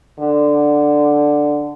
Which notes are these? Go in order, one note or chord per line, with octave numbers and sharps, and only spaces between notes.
D3